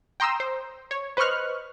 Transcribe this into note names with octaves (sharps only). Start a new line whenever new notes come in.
G5 A#5 C6 D#6 E6
C5
C#5
B4 C5 D#5 C#6 F6 F#6